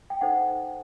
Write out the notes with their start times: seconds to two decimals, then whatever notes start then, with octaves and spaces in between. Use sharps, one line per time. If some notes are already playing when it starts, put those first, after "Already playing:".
0.10 G5
0.21 D#4 A4 C5 F#5